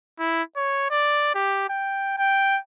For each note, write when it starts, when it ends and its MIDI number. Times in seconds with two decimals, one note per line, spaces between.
0.19 0.43 64
0.56 0.90 73
0.90 1.31 74
1.35 1.65 67
1.69 2.13 79
2.18 2.58 79